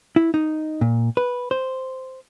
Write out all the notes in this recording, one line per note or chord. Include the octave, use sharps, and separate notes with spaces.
E4
D#4
A#2
B4
C5